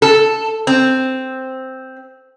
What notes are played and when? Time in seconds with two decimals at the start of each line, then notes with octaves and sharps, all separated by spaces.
0.02 A4
0.67 C4